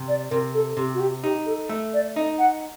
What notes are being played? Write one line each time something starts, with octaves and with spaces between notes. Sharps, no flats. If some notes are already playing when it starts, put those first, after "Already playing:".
Already playing: C3
D5
C3 A#4
A4
C3 G4
F#4
G4
D#4 G4
A4
A3
D5
D#4 D#5
F#5